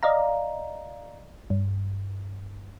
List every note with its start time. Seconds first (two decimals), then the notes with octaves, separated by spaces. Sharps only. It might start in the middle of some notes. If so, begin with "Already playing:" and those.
0.03 D5 D#5 F5 A#5
1.50 G2